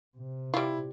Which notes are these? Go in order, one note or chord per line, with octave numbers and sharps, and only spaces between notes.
C3
G3 E4 F4